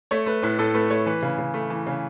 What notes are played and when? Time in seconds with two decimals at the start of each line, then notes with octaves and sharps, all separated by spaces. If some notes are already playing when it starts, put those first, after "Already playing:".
0.11 A3 C#5
0.26 A3 B4
0.42 A2 B4
0.58 A2 A4
0.74 A3 B4
0.90 A3 C#5
1.06 E3 B4
1.22 C#3
1.38 C#3
1.54 A3
1.70 E3
1.87 C#3